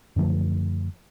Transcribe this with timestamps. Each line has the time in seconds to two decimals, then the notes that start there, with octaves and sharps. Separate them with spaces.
0.16 F#2 D3 F3 A3